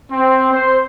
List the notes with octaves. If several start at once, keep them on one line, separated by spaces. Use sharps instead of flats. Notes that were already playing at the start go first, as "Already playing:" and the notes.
C4
C5